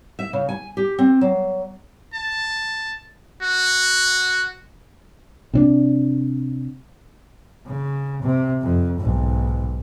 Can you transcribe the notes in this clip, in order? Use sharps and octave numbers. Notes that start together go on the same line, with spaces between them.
E5
C#3
G#5
G4
C4
F#3
A5
F#4
C3 C#4 D4
C#3
C3
F2
B1 G#2